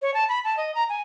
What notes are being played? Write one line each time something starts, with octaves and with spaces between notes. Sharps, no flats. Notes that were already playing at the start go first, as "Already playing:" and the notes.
C#5
A5
B5
A5
D#5
A#5
G#5